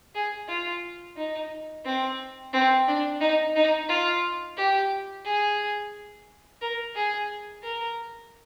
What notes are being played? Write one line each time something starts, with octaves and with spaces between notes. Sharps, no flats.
G#4
F4
D#4
C4
C4
D4
D#4
D#4
F4
G4
G#4
A#4
G#4
A#4